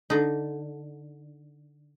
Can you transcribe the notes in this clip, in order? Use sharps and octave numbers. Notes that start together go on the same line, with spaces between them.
D3 D#4